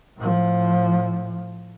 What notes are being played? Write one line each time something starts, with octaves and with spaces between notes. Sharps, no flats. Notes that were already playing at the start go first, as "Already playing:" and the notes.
A2 F3